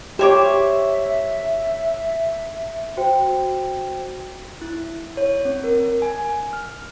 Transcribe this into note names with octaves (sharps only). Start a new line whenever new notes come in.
G4 C5 C#5 E5 D6
F#4 C5 G5
E4
C#5
C4
A#4
G#5
F6